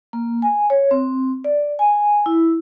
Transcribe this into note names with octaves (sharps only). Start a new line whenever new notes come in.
A#3
G#5
C#5
C4
D5
G#5
E4